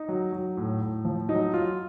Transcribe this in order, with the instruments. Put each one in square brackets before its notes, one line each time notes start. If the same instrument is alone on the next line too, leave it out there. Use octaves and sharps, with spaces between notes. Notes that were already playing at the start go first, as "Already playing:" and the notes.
Already playing: [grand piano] D#4
F#3
F#3
A2
A2
F3
F#3 D#4
F#3 F4